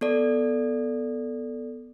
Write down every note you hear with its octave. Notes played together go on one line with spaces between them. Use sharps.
B3 A4 D5